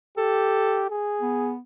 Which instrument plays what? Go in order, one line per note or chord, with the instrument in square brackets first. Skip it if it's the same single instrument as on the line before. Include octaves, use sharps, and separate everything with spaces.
[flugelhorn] G4 [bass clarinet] A4
[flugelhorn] G#4
[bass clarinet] B3